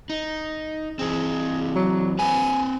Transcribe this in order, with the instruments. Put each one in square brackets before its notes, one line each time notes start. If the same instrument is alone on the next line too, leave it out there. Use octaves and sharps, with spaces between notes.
[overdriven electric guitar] D#4
[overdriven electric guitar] E3 C4 [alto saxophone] G#4
[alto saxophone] F#3
[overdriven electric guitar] C4 B4 [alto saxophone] G#5